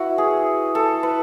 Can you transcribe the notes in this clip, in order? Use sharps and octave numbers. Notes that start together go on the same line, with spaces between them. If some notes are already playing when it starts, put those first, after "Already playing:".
Already playing: E4 F#4 B4
G#4
A4
B4